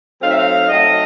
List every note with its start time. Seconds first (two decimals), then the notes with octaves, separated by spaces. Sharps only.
0.22 F#3 A3 C4 D#4 F5
0.30 E5
0.38 F5
0.68 F#3 A3 C4 D#4 D#5